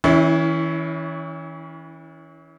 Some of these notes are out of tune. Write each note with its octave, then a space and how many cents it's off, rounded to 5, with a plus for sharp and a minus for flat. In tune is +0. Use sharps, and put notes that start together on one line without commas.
E3 -35 C#4 +20 E4 +0